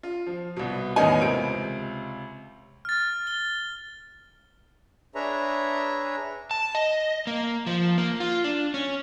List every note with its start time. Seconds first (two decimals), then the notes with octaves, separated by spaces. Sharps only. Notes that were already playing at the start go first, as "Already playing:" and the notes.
0.03 F4
0.26 F3
0.57 C2 B2
0.96 A1 E2 D#3 B3 D#4 G#5
1.21 C#2 C3 D7
2.85 F6 A6
3.27 G7
5.15 D4 G#4 B4 C#5 E5 A#5
6.51 A5
6.75 D#5
7.27 A#3
7.67 F3
7.98 A#3
8.20 F4
8.44 D4
8.74 C#4